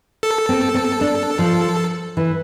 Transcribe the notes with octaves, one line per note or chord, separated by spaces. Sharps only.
A4
C4
C4
D4
F3
E3